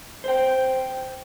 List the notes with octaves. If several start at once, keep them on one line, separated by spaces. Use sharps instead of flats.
C5 G5